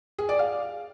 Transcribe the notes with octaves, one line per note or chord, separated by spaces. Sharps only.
G#4
D5
F5